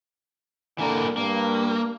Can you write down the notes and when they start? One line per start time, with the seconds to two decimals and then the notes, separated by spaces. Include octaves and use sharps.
0.78 D3 E3 A#3 A#4
1.17 G2 A#3